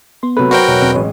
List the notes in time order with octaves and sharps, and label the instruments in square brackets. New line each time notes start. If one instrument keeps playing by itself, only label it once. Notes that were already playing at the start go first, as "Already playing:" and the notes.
[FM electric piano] B3 C6
[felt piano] C3 A3 [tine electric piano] F#3 B4
[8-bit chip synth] F#4 A#4 G5 [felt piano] C5 C#5
[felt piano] E1 [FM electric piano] C#5
[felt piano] E1 C4
[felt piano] A1 G#3 [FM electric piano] E3 C#5